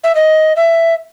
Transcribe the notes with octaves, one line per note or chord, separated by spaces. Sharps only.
E5
D#5
E5